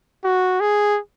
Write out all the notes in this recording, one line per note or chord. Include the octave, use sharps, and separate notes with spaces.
F#4
G#4